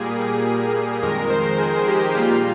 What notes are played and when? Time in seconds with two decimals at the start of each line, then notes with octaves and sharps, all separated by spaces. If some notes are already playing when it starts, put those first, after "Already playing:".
Already playing: A#2 G3 A#3 G#4
0.18 G#4
1.02 F2 D#3 G#3 A#4
1.30 C5
1.58 G#4
1.87 G4
2.14 A#2 G3 A#3 F4